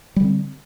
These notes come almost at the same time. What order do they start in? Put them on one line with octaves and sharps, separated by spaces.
G3 D3 C4